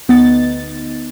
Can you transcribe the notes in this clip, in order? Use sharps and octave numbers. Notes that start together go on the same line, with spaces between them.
D2 B3 D#4 A6